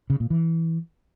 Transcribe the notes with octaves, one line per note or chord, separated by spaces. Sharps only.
C#3
A#2
E3